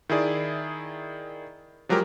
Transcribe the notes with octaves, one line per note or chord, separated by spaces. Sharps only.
D#3 E4 G#4 D5
F3 F#3 G#3 G4 A#4